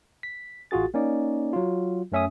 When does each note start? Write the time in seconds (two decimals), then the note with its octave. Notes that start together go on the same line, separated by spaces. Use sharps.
0.23 B6
0.71 A1 F4 F#4 G#4 A6
0.94 A#3 C#4 D#4 D5
1.53 F#3 F4
2.12 F#2 A3 C#4 E5 G#5 D#6